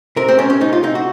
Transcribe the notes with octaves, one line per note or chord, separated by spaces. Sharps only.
C3 A#4
C4
C3 C#4
C#4
C3 D#4
F4
C3 D#4
F#4